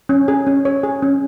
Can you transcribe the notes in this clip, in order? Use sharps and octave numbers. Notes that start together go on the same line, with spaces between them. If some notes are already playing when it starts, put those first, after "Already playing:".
C#4
G#4
C#4
C#5
G#4
C#4